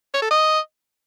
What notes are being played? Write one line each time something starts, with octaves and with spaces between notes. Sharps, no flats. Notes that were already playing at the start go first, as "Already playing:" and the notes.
C#5
A4
D#5